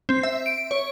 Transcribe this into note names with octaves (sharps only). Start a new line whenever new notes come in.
C4
E5
D7
C#5